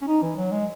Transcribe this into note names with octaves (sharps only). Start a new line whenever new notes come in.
C#4
D#4
E3
F#3
G#3